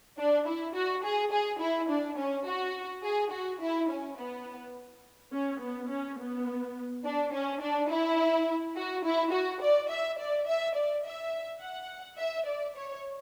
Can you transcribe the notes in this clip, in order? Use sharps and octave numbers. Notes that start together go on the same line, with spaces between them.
D4
E4
F#4
G#4
G#4
E4
D4
C#4
F#4
G#4
F#4
E4
C#4
B3
C#4
B3
C#4
B3
D4
C#4
D4
E4
F#4
E4
F#4
D5
E5
D5
E5
D5
E5
F#5
E5
D5
C#5